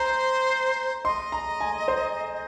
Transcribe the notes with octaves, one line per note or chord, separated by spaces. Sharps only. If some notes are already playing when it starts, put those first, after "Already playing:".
Already playing: C5 A#5
D#5 C6
A#5
G#5
C5